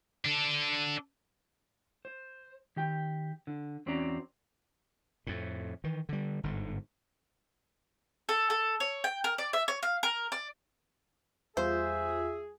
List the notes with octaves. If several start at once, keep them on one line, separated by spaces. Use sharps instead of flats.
D4 A4
C5
D#3 G4 G5
D3
E2 C4 C#4 F#4 D5 A#5
F2 A2
D#3 E3
D3 G3
G1 G#2 D3
A4
A4
C#5
G5
A#4
D5
E5
C#5
F5
A#4
D5
E2 G3 F4 G#4 C5 E5